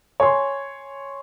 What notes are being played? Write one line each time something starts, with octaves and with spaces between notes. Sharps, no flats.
C#5 G#5 C6